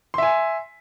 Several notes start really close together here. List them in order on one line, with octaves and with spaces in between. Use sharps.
C6 E5 G#5